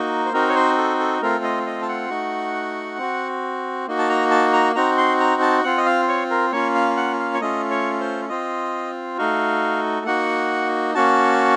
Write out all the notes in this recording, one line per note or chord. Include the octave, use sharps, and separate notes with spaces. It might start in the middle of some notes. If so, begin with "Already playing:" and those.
Already playing: A#3 D#4 F#4
C5
C4 D#4 F#4 A#4
C#5
C5
A4
A4
A3 C4 F4 A#4
D#5
D#5
A5
F#5
A3 D#4 F#4
C4 F#4
A#3 D#4 F#4
A5
A#5
A5
A#5
C4 D#4 F#4 A#5
C6
A#5
A5
C4 F4 F#5
D#5
F5
C#5
A#4
A#3 C#4 F4 C#5
F5
F#5
F5
C#5
A3 C#4 F4 D#5
C#5
C5
C4 F4 D#5
A3 D#4 F#4 F5
A#3 D#4 F#4 F#5
A#3 C#4 F#4 A5